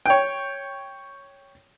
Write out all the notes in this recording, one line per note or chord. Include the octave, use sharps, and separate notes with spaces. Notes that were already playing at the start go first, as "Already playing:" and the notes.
C#5 G5